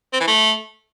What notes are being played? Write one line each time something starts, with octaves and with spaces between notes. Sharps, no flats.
C4
E3
A3